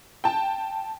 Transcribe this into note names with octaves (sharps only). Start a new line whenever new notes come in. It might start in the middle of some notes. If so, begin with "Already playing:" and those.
G5 A5